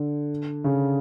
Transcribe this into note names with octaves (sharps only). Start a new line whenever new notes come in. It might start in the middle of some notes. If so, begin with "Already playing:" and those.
Already playing: D3
C#3